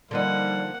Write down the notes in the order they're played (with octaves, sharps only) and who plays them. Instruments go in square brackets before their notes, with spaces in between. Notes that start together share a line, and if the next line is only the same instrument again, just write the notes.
[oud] D3 F3 D#4 [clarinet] G3 [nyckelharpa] A#3 F#5